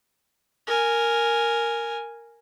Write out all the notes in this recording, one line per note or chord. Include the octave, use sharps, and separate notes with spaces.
A#4 G#5